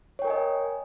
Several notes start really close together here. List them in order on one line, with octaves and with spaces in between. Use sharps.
C#5 G5 A#4 G#5 D#5